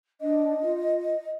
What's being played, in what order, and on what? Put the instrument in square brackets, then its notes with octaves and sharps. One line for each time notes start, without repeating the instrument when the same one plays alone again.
[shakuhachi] D4 [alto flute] D#5
[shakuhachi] F4